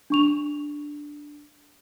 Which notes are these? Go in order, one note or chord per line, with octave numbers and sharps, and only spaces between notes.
D4 C#6 F7